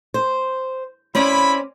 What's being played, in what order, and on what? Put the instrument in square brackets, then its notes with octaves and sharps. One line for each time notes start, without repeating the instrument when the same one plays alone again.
[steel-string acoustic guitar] C5
[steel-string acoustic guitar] C4 C#4 D5 [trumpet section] E4 B5